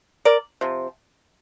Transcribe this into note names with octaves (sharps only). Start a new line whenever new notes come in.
A#4 D5
C3 F3